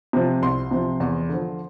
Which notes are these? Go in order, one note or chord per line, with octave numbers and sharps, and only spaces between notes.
C3 F3
C2 C6
C3 F3
E2
D3 F3